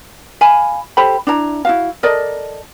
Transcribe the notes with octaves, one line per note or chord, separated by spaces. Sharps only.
F5 G#5 B5
G4 A4 C5 B5
D4 E4 A#5
E4 F#4 F5
A4 A#4 D5 D#5